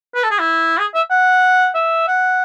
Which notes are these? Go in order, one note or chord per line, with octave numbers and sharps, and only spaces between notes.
B4
A4
G#4
E4
G#4
E5
F#5
E5
F#5